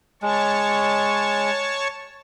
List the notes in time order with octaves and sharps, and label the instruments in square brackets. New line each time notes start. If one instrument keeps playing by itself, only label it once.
[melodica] G#3 [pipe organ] C#5 A5 C#6